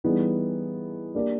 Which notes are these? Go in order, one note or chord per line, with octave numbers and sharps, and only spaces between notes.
E3 G3 B3 D#4 G#4
A#3 D4 G4 A#4 D5